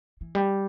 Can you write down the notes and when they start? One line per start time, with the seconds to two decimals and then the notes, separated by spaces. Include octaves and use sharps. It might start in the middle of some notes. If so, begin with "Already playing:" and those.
0.21 E3
0.35 G3